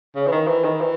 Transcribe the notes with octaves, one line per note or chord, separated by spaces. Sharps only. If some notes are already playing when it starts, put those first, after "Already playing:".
C#3
E3
D#3
E3
D#3
E3